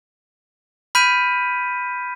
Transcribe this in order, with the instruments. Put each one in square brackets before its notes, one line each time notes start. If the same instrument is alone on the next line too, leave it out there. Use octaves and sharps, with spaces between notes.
[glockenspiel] B5 F6 G6 B6 D7 D#7